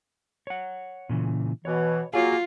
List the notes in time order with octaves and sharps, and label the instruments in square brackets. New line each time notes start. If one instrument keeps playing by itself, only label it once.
[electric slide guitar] C#5 F#5
A#2 C#3 E3
[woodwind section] B2 E3 [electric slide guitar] C#5
[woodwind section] F#3 A#3 [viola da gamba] F4 [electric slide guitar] G#4 G#5